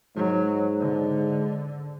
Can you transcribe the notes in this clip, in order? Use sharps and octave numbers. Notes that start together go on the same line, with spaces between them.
G#2 F#3
D3